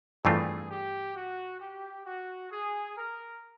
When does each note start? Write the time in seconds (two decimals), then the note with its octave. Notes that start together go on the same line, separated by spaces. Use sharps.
0.24 G2 E3 A3 C4 F4 G#4
0.70 G4
1.15 F#4
1.60 G4
2.06 F#4
2.51 G#4
2.97 A#4